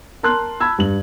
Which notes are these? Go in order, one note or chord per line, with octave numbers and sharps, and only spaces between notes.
A#4 A5 C6 F#6
A5 B5 E6 G#6
G2 F#7